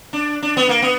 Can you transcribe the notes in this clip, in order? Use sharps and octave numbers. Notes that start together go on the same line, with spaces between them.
D4
D4
B3
A#3
B3